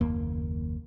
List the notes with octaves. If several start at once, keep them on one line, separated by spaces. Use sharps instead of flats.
F#1 D#2 A#3